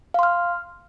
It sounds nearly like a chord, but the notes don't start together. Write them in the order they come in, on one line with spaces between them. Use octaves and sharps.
F5 C6 F6